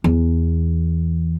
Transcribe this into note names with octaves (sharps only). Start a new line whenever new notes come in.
E2